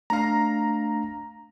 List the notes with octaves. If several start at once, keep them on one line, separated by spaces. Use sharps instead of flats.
A3 D4 F5 A#5